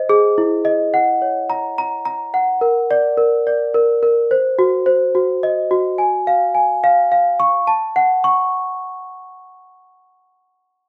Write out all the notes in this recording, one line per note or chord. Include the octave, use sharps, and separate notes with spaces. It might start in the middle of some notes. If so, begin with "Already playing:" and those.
Already playing: C5 D#5
G#4
E4
D#5
F#5
C#5
A#5
A#5
A#5
F#5
A#4
D5
A#4
D5
A#4
A#4
C5
F#4
C5
F#4
D#5
F#4
G#5
F5
G#5
F5
F5
C#6
A5
F#5
C#6